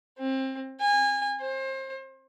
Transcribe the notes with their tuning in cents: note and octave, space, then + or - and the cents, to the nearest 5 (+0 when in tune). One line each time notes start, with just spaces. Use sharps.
C4 +25
G#5 -25
C5 +30